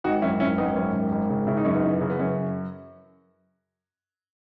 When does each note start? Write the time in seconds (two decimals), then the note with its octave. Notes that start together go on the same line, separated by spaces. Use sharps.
0.04 G#1 D#4 F#4
0.22 F#2 C#4 E4
0.40 G#1 C#4 E4
0.58 G#1 B3 D#4
0.76 F#2 C#4
0.93 G#1
1.11 G#1
1.30 C#3
1.47 C#3 E4
1.57 D#4
1.65 F#2 C#4
1.75 B3 D#4
1.83 E3
2.01 C#3
2.10 B3
2.20 F#2 C#4